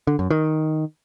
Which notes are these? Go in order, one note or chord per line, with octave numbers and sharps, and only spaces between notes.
D3
F#2
D#3